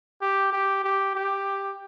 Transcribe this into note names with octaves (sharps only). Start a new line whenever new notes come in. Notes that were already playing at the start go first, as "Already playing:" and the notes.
G4
G4
G4
G4